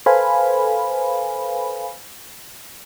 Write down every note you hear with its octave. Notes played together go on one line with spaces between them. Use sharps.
A4 B4 C5 F5 G#5 B5